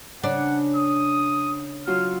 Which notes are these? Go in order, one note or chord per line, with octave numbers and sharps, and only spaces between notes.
C#3 D4 F#5
D#6
F#3 F4 F#4 F6